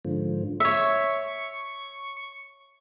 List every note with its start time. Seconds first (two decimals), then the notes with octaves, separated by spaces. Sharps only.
0.05 G#2 D3 F3
0.60 C#5 E5 C#6